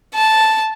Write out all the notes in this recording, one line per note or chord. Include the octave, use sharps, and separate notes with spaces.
A5